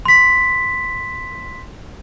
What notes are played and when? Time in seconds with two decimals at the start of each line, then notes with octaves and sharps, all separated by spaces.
0.05 C6 B6